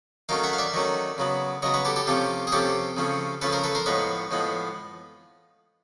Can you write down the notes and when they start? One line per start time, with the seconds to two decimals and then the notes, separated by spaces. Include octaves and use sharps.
0.29 D#3 F#3 A3 C#4 F5 G5
0.43 E5 F#5
0.53 F5
0.58 D5 E5
0.73 D#3 F#3 A3 C#4
1.18 C#3 F#3 B3
1.62 C#3 F#3 B3 C#5 D#5
1.74 B4 C#5
1.85 G4 A4
1.96 G4 A4
2.07 C3 F3 A3 C#4 F4 G4
2.47 G#4
2.52 C3 F3 A3 C#4 G4 A4
2.97 C#3 F3 A3 C#4
3.41 C#3 F3 A3 C#4 A4 B4
3.52 A#4 C5
3.64 A4 B4
3.75 A#4 C5
3.86 A2 F3 G#3 B3 B4 C#5
4.31 A2 F3 G#3 B3